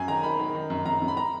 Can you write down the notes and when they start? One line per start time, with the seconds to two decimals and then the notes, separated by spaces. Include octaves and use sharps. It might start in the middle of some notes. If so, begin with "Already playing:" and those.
Already playing: F#2 G#5
0.08 D#3 A#5
0.23 D#3 B5
0.39 D#3
0.55 D#3
0.70 F#2
0.86 F#2 A#5
1.02 F#2
1.08 B5
1.17 A#5